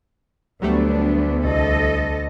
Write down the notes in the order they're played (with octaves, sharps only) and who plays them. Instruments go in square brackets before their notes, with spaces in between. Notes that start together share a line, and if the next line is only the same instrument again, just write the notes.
[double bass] D2 [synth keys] F#3 G3 A3 [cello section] B3 D4
[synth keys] C2 [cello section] A4 D#5